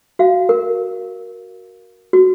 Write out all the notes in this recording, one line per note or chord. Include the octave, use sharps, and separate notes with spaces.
F#4 F5
A#4
F#4